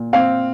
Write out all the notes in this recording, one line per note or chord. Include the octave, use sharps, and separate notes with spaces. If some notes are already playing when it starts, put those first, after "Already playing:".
Already playing: A#2
C4 F5